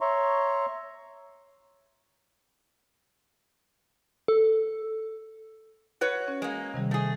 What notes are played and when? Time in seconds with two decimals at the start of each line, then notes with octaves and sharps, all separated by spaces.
0.01 C#5 E5 A#5 C6 C#6
4.28 A4
6.01 F#4 B4 C#5
6.28 C#4
6.42 G#3 A#3
6.74 C3 D#3 G3
6.91 A3 G#4